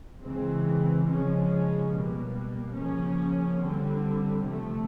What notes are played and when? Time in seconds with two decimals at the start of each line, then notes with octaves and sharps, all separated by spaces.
0.21 C#3 E3 G#3 C4
1.05 C#3 F3 G#3 C#4
1.90 B2 G3 A#3
2.75 C#3 F3 A#3 C#4
3.60 D3 G3 C4
4.45 C3 F3 A3